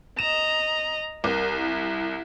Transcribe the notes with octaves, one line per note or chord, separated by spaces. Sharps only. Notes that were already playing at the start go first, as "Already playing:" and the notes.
D#5 A#5 E7
C2 A#4
E4